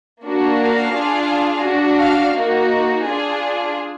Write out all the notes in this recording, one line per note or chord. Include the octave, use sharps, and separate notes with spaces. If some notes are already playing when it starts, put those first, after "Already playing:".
A#3 D4 F#4
F5
D4 F4 G#4
D4 F#4
F5
A#3 D#4 F#4
D4 F4 G#4